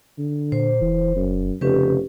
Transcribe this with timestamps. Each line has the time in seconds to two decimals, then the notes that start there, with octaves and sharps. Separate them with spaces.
0.19 D3
0.52 A#2 C5
0.82 F1 E3
1.16 F#2
1.61 F1 C#3 C#4 G4 B4